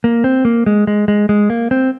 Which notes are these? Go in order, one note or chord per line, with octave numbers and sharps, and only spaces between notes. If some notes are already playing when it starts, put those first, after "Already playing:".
A#3
C4
A#3
G#3
G#3
G#3
G#3
A#3
C4